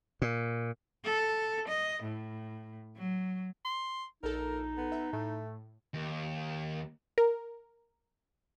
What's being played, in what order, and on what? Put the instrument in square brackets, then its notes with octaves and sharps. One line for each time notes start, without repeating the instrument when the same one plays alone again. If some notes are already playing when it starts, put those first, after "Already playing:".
[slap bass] A#2
[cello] A4
D#5
A2
F#3
[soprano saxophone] C6
[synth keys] A#1 A4 [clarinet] D#4 [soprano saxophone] A#4
[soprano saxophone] B3
[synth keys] E5
[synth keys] A2 [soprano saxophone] A3
[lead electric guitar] D#2
[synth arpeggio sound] A#4